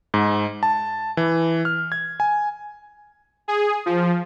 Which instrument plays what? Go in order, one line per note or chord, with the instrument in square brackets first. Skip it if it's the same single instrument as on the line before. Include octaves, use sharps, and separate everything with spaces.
[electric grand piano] G#2
A5
E3
F6
G#6
G#5
[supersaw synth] G#4
F3